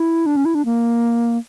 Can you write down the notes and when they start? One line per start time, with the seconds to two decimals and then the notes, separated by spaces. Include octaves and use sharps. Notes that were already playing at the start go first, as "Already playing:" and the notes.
Already playing: E4
0.26 D4
0.36 C#4
0.45 E4
0.55 D4
0.65 A#3